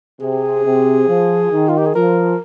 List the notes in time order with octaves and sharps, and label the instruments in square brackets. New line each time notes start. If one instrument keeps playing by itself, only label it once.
[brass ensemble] C3 [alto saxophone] G#4
[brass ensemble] C3
F3
D#3
[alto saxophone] F4
G4
G#4
[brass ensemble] F3 [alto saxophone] A#4